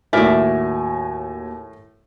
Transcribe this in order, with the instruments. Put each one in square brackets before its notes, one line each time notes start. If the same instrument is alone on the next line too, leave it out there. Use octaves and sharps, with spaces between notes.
[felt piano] D#2 F#4 G#5 [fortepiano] A2 [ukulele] A#4 D5 E5